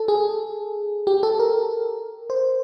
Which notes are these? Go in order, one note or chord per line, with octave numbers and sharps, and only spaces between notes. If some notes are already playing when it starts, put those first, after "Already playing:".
Already playing: A4
G#4
G4
A4
A#4
C5